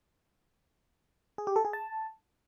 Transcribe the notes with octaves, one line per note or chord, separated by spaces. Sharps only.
G#4
G4
A4
G#4
A5